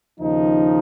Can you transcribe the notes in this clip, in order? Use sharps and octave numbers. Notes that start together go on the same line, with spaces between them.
D#2 C#3 F3 D#4